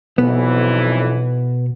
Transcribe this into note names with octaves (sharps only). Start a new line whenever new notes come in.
B1 F2 B2 E3 B3